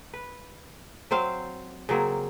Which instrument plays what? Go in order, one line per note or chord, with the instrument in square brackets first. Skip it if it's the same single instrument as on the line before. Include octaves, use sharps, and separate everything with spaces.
[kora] B4
F#3 C4 C5 F5
C#3 F#3 A#3 C4